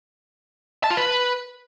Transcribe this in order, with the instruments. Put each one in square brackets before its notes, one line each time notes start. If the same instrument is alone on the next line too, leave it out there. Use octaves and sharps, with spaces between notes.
[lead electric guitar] A5
F4
B4